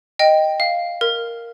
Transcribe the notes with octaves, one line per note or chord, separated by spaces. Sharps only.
D#5 G5
F5
A#4